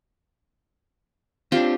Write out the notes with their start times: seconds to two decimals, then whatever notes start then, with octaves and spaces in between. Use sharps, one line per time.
1.52 C4 D4 F4 G4 G5